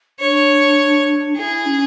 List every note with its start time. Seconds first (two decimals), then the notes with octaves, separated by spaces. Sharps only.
0.20 D4 C#5
1.37 E4 G#4
1.66 C#4